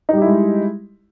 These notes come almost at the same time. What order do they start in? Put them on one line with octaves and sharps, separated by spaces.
D#4 G3 G4 E4 G#3